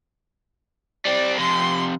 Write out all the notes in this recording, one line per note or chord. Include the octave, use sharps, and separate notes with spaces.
G3 C4 D5
F2 C3 C6